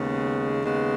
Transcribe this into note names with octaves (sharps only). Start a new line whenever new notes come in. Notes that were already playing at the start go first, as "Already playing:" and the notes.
Already playing: D#2 C#3 G#3 B3
D#2 C#3 G#3 B3